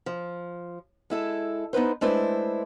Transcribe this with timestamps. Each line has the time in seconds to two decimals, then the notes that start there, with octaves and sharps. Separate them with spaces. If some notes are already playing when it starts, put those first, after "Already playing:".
0.06 F3
1.10 G#3 E4 A4
1.73 B3 D#4 E4 B4 C5
2.01 G#3 A3 D4 E4 B4 C5